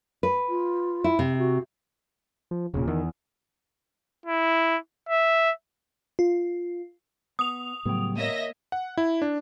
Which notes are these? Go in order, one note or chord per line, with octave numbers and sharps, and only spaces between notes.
B4
F4
E4
C3 E5
F#4
F3
E1 A#2 C#3
E2 D#3
E4
E5
F4
B3 D#6 F7
C#2 A2 F#3 G3 B3 G5
A#3 A#4 C#5 D#5 E5 A#6
F#5
E4
D4